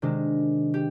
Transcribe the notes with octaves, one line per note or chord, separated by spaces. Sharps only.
C3 D#3 G#3 D4
G4